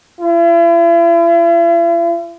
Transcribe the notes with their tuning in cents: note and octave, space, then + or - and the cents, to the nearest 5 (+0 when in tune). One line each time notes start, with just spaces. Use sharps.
E4 +45